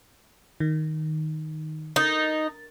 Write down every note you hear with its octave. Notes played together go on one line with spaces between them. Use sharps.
D#3
D#4 A#4 A6